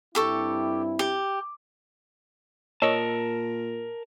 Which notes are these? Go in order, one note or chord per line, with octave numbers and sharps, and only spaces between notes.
G2 C4 E4 G4 A4 C#6
G4
A#2 A#4 C#5 D#5 A5 E6